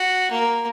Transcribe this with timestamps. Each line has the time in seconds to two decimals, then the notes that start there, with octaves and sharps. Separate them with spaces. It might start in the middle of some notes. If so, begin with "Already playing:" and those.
Already playing: F#4
0.31 A#3